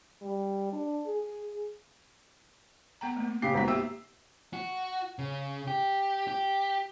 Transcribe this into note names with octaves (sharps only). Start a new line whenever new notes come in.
G3
D4
G#4
B3 G5 A#5
A3 A#3
C#3 G4 C7
G#1 A#3 B3 A#5 B6
G4 E5 G5 E6
F#4
C#3
G4
G4